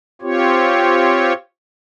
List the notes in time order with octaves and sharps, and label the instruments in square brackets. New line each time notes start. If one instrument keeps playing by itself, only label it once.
[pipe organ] C4 F4 G4 C#5